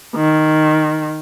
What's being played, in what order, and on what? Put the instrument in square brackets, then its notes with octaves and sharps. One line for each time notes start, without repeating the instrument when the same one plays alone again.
[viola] D#3